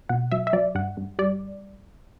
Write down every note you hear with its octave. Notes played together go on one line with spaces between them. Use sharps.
B2 F#5
F#3 E5
E5
F#3 D5
G2 F#5
G2
G3 D5